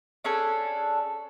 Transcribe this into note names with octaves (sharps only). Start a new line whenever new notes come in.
C#4 D4 G#4 A4